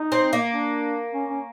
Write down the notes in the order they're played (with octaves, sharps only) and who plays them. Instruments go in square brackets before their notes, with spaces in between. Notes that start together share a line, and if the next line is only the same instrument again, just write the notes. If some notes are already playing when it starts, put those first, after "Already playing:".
Already playing: [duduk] D#4
[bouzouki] C4
A#3
[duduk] D4
C#4
C#4